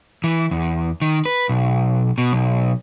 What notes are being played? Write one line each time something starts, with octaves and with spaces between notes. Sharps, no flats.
E3
E2
D#3
B4
B1
B2
B1